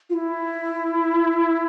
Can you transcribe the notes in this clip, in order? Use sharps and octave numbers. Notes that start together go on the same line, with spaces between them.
F4
E4